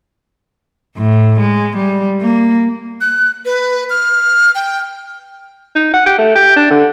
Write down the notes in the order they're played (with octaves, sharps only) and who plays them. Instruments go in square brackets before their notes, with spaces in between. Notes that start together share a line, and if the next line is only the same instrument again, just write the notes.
[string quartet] A2
G#3
G3
A#3
[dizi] F#6
B4
F6
G5
[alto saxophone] D#4
F#5
G4
A3
G4
D4
D3